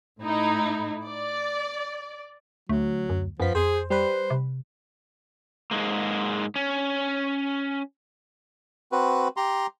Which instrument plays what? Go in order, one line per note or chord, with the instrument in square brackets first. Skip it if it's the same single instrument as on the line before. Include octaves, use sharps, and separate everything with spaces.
[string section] A2 D#4 E4
D5
[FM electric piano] D2 [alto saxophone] F#3 [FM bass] A3
[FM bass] F#2
[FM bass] F#2 [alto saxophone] F3 [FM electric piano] B3 B6
[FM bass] F2 [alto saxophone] G#4 [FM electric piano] C5
[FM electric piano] G3 B4 [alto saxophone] C5
[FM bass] C3
[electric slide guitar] G#2 G#3 A#3
C#4
[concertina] C4 F#4 B4
G4 A#5 C6